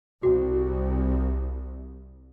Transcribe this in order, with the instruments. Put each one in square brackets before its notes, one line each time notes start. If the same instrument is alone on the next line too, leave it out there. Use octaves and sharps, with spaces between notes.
[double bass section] C2 [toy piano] F#4